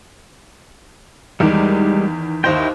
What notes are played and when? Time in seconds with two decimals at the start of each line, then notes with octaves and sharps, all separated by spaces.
1.40 E2 D#3 G3 G#3 G4
2.44 D#2 D#4 E4 C5 D#5 G5